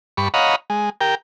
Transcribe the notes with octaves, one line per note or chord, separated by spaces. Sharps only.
G2 B5 C#6
C#5 D#5 F5 F#5 A#5 B5
G#3
G4 A#4 G5